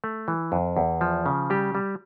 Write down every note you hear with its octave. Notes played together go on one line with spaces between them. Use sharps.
A3
E3
F2
E2
F3
C#3
G3 G4
G3